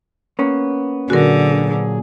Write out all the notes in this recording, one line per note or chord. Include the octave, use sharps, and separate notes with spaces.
A#3 B3 C#4
A#2 D3 F#3 F#4 G#4 A#4